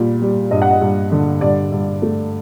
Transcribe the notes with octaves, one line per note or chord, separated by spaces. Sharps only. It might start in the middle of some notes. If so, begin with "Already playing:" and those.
Already playing: A#2 G3 D5
G3
G2 D#5
F#5
D#5
G2
D3
G2 D5
G2
A3